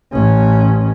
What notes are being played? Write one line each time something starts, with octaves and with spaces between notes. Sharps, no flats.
A1 C#4